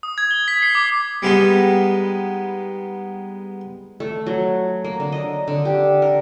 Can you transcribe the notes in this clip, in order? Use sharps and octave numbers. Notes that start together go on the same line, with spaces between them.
D#6
G#6
G7
B6
C7
D6
G3 G#3 B3 D#4
A3
F#3
A#3
D3
D#5
D3
G4
A#4